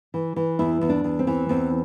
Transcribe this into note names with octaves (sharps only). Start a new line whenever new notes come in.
E3
E3
E2 E4
E2
D4
E2
C4
E3
E2 C4